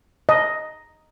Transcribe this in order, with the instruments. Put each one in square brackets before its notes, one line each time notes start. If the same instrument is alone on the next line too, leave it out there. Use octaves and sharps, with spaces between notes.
[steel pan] D#5